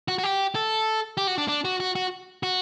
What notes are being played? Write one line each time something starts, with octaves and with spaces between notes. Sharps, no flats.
F#4
F#4
G4
A4
G4
F#4
D4
D4
F#4
F#4
F#4
F#4